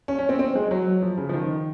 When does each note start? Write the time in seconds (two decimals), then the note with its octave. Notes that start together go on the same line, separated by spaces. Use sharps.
0.08 C#4
0.19 C#4
0.29 C4
0.39 C4
0.55 G#3
0.71 F#3
1.03 F3
1.18 C#3
1.29 F3
1.33 D#3